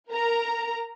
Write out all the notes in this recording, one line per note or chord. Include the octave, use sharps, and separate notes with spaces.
A#4 A#5